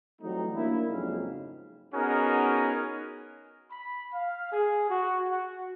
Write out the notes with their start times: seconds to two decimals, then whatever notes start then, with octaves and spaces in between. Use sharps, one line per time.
0.22 E3 F#3 G3 A3 C4 D#4
0.55 A#3 D4 E4
0.88 F2 G#2 C#3 F#3 D#4 F5
1.94 B3 C#4 D#4 F#4 G#4 A#4
3.71 B5
4.13 F5
4.51 G#4
4.87 F#4
5.27 F#4